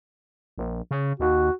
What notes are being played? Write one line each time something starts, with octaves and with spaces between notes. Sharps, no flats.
A#1
C#3
D#2 F#4